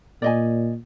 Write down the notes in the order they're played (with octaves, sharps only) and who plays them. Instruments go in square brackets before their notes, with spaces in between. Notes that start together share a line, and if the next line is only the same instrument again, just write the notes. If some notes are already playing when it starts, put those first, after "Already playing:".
[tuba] A#2 [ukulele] D5 D#5 G#5